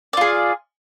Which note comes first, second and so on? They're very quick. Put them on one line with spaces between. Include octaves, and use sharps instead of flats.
D5 F4 G#4